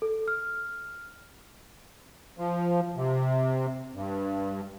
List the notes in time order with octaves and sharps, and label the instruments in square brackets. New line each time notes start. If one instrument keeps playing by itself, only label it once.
[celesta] A4
F6
[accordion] F3
C3
G2